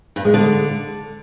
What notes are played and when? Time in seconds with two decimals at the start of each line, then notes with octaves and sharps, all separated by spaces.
0.16 G2
0.25 G#3
0.34 D3